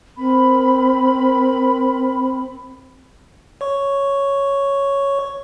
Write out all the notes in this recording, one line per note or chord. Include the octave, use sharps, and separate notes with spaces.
C4 A#4 B5
C#5 C#6